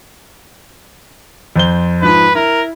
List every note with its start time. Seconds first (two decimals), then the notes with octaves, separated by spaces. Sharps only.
1.56 F2 C5 G7
2.02 G#2 F3 B4
2.35 E4 A#4